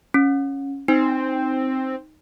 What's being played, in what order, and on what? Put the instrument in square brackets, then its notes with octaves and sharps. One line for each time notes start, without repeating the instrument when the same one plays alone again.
[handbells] C#4
[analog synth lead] C4 [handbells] D#4